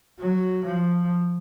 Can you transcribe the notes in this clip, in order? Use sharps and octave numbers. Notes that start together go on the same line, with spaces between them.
F#3
F3